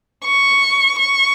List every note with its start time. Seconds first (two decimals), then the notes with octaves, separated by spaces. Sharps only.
0.24 C#6
0.98 C#6